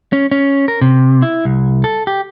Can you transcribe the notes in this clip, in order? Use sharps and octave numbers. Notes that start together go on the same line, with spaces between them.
C#4
C#4
A#4
C3
E4
C2
A4
G4